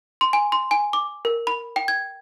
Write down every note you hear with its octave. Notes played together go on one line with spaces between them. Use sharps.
C6
G#5
C6
G#5
D6
A#4
B5
G5
G#6